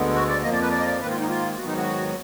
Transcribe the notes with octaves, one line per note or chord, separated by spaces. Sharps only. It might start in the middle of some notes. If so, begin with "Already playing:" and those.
Already playing: D2 D3 G#3 B3
F#4
D5
F2 F3 A#3 D#5
D5
B4
D5
D#5
D5
G#2 D#3 A#3 B4
F4
D#4
F4
G#2 D#3 F#3 B3 F#4
D#4
F#4